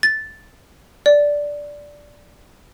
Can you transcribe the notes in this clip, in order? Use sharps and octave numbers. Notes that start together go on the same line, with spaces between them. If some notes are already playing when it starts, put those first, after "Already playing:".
A6
D5